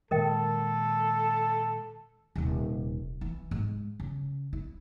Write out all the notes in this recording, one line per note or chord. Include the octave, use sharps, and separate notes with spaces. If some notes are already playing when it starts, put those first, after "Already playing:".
A#2 D#3 G#3 A4 A#4 D#5 G5
D#1 C3
E3
G#2
C#3
E4